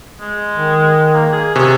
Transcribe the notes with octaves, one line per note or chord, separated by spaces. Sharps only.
G#3
D#3
A#3
G#4
C3 C#4